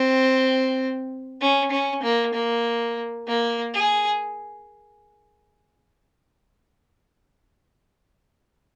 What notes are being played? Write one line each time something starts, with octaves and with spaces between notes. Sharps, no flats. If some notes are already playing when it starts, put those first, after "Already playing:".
Already playing: C4
C#4
C#4
A#3
A#3
A#3
G#4